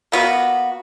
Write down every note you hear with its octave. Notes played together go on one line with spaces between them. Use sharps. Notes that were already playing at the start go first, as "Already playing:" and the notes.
A#3 B3 F#4